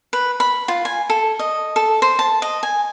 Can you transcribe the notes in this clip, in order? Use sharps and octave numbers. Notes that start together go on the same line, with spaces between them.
B4
B5
F4
G#5
A4
D#5
A4
C5
A5
D#5
G#5